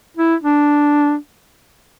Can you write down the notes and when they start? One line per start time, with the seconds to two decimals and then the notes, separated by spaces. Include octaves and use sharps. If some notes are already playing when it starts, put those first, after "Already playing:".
0.17 E4
0.43 D4